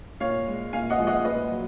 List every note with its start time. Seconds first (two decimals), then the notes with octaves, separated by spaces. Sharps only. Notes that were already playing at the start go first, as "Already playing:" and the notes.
0.20 A#2 C#5 F5
0.47 G#3
0.73 A#2 F5 G#5
0.90 D#5 F#5
0.99 F3 G#3
1.07 D#5 F#5
1.25 A#2 B4 D#5
1.50 F#3